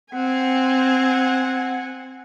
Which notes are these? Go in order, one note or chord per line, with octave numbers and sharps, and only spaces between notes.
C4 F#5 G#5